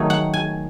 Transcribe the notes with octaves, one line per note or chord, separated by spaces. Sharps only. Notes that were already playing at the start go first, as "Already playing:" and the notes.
Already playing: D#3 F#3 A3 D#4 G#5
F#5
G#5